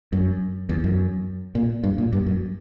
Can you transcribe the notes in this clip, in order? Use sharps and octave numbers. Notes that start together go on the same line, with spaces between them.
F#2
E2
F#2
A#2
G2
A#2
G2
F#2